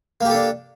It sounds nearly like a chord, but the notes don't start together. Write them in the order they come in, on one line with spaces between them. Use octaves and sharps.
A#3 G4 A4 D4